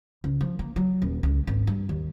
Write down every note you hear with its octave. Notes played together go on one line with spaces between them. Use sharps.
C#2
F3
A#3
F#3
D#1
C#2
G#1
G2
D#2